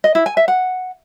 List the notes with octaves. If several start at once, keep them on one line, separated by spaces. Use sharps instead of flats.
D#5
E4
G#5
E5
F#5